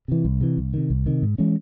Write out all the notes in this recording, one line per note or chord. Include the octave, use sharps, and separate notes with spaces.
C3 E3
C2
C3 E3
C2
C3 D#3
C2
C3 D#3
G#2
E3 G#3 C#4